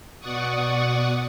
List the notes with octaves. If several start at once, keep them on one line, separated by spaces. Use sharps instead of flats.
B2 D5 F#5 C#6 D#6